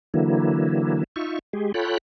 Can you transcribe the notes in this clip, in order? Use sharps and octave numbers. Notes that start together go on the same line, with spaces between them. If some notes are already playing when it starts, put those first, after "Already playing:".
D3 E3 F#3 A#3 E4
D#4 F4 E5 C#6
G#3 G4 G#4
F4 A4 C#5 G5 B5 F#6